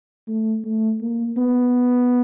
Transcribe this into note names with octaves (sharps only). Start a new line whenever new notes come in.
A3
A3
A#3
B3